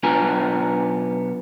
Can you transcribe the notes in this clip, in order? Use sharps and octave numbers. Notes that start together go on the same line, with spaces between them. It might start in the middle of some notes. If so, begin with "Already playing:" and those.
B1 B3 D4 F4 G#5 A#5